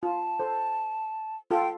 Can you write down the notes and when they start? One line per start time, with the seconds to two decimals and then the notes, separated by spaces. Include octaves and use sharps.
0.03 F4 A5
0.40 A4 C5
1.51 F4 A4 G5